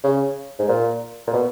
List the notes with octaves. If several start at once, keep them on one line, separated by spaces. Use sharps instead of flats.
C#3
G#2
A#2
A#2
B2